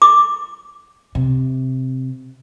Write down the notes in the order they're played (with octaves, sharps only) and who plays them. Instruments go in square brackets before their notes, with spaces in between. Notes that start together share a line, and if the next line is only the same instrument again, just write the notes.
[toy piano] D6
[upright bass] C3